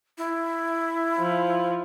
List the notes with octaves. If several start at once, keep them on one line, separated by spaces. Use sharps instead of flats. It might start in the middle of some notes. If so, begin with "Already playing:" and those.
E4
F3